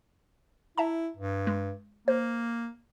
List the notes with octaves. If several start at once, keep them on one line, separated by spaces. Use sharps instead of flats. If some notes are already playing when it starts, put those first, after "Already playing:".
E4 E5 A5 A#5
G2
G#3
A#3 C5